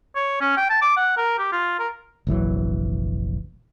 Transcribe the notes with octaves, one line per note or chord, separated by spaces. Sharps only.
C#5
C#4
G5
A5
D6
F#5
A#4
G4
F4
A#4
F1 A#1 E3 F#3